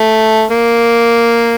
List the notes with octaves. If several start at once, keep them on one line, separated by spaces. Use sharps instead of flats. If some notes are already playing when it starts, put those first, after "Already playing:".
Already playing: A3
A#3